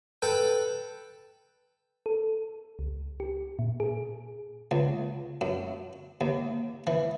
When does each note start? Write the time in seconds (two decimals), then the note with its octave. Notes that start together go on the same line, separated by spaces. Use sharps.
0.22 A4 B4 G5
2.06 A4
2.79 C#2
3.20 G4
3.59 A#2
3.80 G#4
4.71 C#2
5.41 F#2
6.21 D#2
6.87 E3